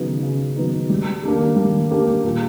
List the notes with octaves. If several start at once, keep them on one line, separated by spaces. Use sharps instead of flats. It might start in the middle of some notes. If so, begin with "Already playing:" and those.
Already playing: C#3 F#3 B3 D#4
C#3
F#3 B3 D#4
G3
A#3 D4 G4
G3
A#3 D4 G4
A#2